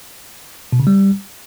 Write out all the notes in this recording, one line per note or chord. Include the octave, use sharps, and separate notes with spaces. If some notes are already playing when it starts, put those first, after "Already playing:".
B2
C#3
G3